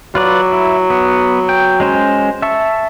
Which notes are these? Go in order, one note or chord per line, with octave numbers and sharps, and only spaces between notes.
F#3 F4 B4 D5
E4
B3
G5
G#3 C#4 C5
E5 A5 C#6